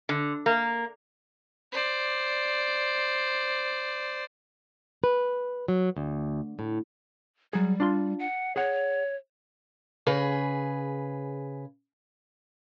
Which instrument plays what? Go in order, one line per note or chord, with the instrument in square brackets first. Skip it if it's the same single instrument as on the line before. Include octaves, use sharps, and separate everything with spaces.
[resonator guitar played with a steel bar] D3
A#3
[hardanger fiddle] C5 D5
[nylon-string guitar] B4
F#3
D2
A2
[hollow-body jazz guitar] F#3 G#4 [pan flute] G3
[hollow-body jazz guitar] D4 F4 C6
[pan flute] F#5
[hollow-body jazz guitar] G#4 F#5 [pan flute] C#5
[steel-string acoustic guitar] C#3 G#4 B4